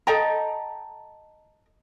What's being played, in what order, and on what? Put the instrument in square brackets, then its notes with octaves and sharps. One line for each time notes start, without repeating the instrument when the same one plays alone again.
[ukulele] A4 D#5 G5 A#5